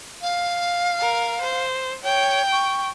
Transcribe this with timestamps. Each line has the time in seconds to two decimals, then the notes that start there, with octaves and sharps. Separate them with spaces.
0.22 F5
1.01 A#4
1.41 C5
2.04 C#5 G5
2.52 C#6